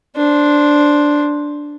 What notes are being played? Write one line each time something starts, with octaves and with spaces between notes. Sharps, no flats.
D4 C5